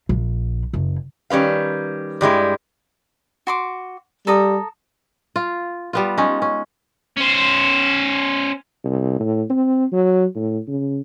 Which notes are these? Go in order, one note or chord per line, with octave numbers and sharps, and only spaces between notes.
A#1
F#1
D#3 G3 C#4 B4 F5
G2 G3 G#3 E4
F#4 C6 D6
G3 A4 A#5 D#6
F4
G3 B3 F4
G#3 C#4 D#4
C#4
C#4 C5
C2
A2
C4
F#3
A2
C#3